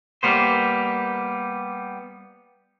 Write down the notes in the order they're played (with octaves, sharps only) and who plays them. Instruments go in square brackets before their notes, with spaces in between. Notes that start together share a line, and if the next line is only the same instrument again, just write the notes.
[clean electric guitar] G3 A#3 B3 C5